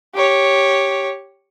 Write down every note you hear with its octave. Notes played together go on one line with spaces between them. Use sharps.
G4 C#5